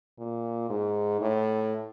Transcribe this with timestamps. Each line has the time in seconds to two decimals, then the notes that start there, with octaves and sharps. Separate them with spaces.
0.18 A#2
0.70 G#2
1.21 A2